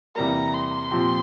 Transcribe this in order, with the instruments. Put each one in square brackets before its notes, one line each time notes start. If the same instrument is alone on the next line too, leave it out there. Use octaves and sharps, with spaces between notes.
[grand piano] E2 C3 G3 A#3 [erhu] A#5
[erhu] C6
[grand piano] A#2 F3 C4 G4